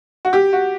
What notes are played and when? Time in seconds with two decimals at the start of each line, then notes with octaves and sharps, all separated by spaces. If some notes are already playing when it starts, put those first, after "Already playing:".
0.25 F#4
0.33 G4
0.53 F#4